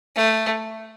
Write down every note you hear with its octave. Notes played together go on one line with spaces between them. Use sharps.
A3